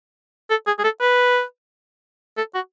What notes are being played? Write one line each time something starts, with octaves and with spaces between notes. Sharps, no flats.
A4
G#4
G#4
A4
B4
A4
F#4